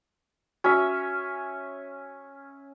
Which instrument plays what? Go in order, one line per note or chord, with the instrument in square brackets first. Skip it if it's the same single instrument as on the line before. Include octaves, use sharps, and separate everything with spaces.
[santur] C#4 E5 [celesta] F#4